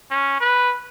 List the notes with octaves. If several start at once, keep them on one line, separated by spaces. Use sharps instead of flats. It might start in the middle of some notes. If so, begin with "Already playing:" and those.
C#4
B4